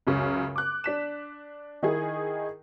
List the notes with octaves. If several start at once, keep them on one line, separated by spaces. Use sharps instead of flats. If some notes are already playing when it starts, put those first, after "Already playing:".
C#2 F#2 C#3
D6 F#6
D4 B6 E7
D#3 D#4 E4 G#4